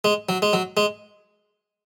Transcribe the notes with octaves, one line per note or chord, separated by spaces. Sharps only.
G#3
F#3
G#3
F#3
G#3